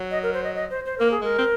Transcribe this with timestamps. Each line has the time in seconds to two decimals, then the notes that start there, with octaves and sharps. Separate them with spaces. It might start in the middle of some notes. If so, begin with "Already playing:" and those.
Already playing: F#3
0.11 D#5
0.23 A#4
0.33 C5
0.44 D#5
0.55 D#5
0.70 C5
0.86 C5
0.98 A#3 A#4
1.11 G#4
1.22 G#3 A#4
1.38 C4